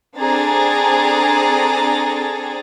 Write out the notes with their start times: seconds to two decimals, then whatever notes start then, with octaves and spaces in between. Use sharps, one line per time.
0.16 C4 D4 G#4 A4 A#5 A6